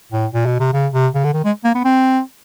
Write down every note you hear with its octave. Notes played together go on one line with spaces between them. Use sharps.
A2
A#2
B2
C3
C#3
C3
C#3
D3
D#3
G#3
A#3
B3
C4